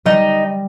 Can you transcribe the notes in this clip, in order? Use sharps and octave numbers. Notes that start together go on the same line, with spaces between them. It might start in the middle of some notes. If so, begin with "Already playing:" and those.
G3 D#4